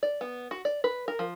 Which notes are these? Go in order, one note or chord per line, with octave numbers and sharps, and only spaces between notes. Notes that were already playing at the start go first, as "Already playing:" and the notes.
D5
B3
F#4
D5
B4
A#4
F3